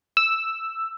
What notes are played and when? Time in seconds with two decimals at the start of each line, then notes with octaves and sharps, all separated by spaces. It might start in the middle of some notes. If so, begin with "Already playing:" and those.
0.17 E6